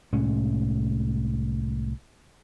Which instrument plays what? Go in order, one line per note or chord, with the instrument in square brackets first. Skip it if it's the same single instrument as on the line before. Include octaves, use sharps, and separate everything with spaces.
[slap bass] C2 A2 G#3 C#4